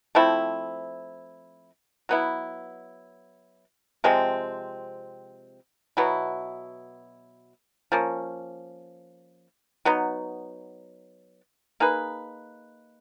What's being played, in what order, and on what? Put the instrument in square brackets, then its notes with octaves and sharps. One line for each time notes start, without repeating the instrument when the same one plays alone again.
[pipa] F3 A3 C4 E4
F#3 B3 E4
C3 F3 G#3 C4
B2 F#3 B3 E4
F3 A#3 C#4
F#3 B3 D#4
A#3 D#4 G#4 B4